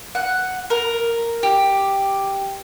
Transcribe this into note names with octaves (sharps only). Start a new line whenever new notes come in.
F#5
A#4
G4